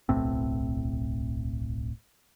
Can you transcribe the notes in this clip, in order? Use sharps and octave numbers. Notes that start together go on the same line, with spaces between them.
D1 B1 A2 C4